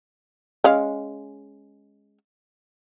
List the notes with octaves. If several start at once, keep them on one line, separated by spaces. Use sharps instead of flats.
G#3 C#4 F5